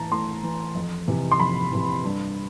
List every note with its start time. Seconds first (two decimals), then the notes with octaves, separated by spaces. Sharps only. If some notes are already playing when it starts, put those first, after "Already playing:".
Already playing: A2 E3 A5 A#5
0.12 A2 C6
0.43 E3
0.75 F2
1.07 C3 E3
1.32 C6
1.39 F2 B5
1.71 C3 E3
2.04 G2